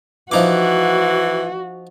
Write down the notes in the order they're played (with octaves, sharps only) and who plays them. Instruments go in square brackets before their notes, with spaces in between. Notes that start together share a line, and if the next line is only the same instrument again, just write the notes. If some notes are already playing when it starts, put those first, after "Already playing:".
[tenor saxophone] E3 [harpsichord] F3 D#4 D6 [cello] F#4